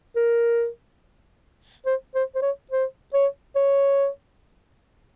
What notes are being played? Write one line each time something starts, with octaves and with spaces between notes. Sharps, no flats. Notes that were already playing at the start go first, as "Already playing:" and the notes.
A#4
C5
C5
C5
C#5
C5
C#5
C#5